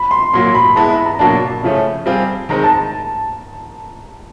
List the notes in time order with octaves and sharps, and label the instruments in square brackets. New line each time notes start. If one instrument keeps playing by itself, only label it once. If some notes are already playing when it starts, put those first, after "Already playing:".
Already playing: [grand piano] B5
C6
[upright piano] A#2 F#3 A#3 [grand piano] C6
[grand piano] B5
[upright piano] G#3 B3 E4 [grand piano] A5
[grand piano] B5
A#5
[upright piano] B2 F#3 A#3 D4 [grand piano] A5
[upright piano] C#3 F3 A3 C#4
G3 C4 F4 G#4
[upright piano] D#3 G#3 C4 [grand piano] A#5
[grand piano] A5